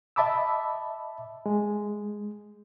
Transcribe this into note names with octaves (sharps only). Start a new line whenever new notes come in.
D#5 E5 A5 B5 D6 E6
G#3